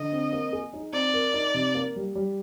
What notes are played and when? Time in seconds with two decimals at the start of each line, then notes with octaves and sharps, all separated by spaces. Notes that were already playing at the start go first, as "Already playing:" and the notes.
Already playing: D3 D#5
0.12 C4
0.32 A#3
0.53 G#4
0.73 D#4
0.93 C4 D5
1.14 A#4
1.34 D#4
1.54 C3
1.75 A#3
1.96 G3
2.15 G3